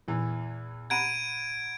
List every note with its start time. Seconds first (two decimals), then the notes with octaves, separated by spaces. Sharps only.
0.08 E2 A#2 E3
0.90 F#5 A#5 B5 G#6 D7 D#7